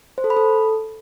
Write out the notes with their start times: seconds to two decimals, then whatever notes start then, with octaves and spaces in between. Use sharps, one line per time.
0.18 C5
0.24 A4
0.30 B5
0.37 A4